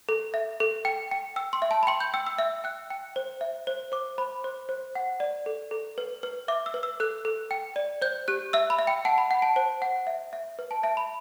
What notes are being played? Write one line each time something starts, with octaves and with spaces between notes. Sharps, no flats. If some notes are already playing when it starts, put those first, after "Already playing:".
A4
E5
A4
G5
G5
G5 E6
C6
E5
A5
B5
G5 C6
G6
G5 E6
E6
E5 E6
G5 F#6
G5
C5
E5
C5
C5 D6
C5 B5
C5 C6
C5
F#5
D5
A4
A4
B4
B4
E5 D6
E6
B4
E6
A4 F#6
A4
G5
D5
C5 G6
G4 F#6
E5 E6
B5
E5
G5
F#5 A5
B5
F#5
A5
C5 A5
F#5
E5
E5
B4
A5
E5 A5
B5